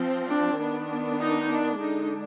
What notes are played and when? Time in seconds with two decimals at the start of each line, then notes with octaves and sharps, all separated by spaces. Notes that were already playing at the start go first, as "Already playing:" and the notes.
Already playing: F3 C4
0.29 D4
0.59 D#3 B3 D4
1.19 D#4
1.48 D4
1.79 D3 G#3 D4 D#4